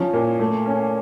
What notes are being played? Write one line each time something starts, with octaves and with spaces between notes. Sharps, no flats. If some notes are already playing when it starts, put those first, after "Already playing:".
Already playing: F3 C#4
A#2
A3
C#4